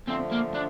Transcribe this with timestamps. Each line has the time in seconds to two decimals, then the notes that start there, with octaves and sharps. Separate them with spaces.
0.07 D3 F3 A3 C4
0.31 A#3
0.54 D4